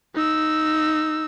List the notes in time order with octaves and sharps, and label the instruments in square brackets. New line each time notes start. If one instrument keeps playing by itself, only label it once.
[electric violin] D#4 E6